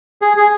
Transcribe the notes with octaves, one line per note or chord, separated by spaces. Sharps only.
G#4
G#4